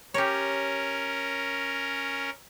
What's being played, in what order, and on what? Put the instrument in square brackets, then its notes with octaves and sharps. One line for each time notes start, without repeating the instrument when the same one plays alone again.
[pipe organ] C#4 A#4 [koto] G4 C#5